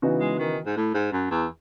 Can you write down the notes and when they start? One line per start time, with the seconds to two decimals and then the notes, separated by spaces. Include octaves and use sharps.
0.02 C#3 E3 B3 D#4 F#4
0.20 G#3
0.39 D#3
0.66 G#2
0.76 A2
0.94 G#2
1.12 F#2
1.31 E2